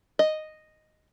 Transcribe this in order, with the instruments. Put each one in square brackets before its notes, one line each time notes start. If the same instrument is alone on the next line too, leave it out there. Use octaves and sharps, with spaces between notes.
[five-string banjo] D#5